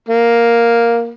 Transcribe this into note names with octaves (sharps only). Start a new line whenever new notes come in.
A#3